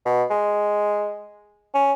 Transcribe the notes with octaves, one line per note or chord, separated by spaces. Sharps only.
B2
G#3
C#4